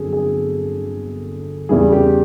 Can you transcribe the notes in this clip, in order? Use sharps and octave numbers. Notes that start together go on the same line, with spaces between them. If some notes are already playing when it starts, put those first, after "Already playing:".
Already playing: G1 F2 F#3 G#4 A4
G#4
E2 C#3 E3 G3 G#4
G4